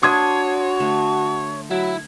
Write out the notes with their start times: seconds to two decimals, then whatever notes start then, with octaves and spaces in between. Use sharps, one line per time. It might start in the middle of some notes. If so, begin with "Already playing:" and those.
0.03 D4 F#4 C#5 D5 C6 D#6 G#6
0.80 D3 A3
1.71 F#3 E4